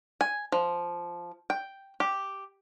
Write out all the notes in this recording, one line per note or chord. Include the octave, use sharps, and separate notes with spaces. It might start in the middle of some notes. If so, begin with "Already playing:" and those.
G#5
F3
G5
G4